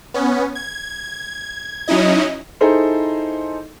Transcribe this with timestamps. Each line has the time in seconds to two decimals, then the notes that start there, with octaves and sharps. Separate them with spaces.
0.14 B3 C#4
0.55 G#6
1.88 F#3 C#4 D#4 E4 D#5
2.61 D#4 E4 G#4 A4 C5